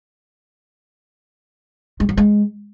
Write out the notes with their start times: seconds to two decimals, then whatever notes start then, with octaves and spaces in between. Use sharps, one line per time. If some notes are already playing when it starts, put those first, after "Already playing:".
2.00 G#3
2.09 F#3
2.17 G#3